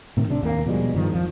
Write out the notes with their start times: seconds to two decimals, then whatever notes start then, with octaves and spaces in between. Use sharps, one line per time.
0.17 A2 C3 D#3
0.28 D1 C3 C#4 D4
0.43 D#2 A#3
0.66 B2 F3 G3 G#3
0.94 G2 D#3 F3
1.12 F2 F3